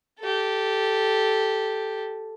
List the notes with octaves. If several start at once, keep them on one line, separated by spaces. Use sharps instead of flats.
G4 A4